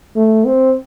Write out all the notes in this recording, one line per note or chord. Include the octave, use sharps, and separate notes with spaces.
A3
C4